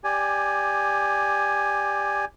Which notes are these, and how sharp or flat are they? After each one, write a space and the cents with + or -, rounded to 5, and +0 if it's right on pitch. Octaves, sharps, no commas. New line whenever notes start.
G4 +15 D5 +0 G#5 +0